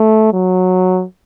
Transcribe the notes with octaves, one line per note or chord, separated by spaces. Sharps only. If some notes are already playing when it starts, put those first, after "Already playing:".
Already playing: A3
F#3